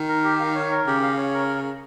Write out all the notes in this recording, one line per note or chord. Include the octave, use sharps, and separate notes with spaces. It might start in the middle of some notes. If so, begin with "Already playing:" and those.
Already playing: D#3
A#4
G4
F5
C#5
A#4
C#3 G4
F5
C#5
A#4